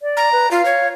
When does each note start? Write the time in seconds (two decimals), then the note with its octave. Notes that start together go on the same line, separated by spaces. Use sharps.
0.01 D5
0.17 A#5
0.32 B4
0.51 F4 F5
0.65 C#5